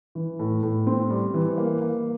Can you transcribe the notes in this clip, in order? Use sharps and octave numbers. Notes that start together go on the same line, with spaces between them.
E3
A2
A2
C4
G3
E3
A#3
A#3